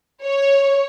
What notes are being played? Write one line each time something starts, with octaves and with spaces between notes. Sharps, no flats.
C#5